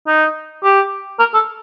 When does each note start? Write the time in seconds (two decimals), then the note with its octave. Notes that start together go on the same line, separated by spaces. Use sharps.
0.07 D#4
0.64 G4
1.19 A#4
1.34 A4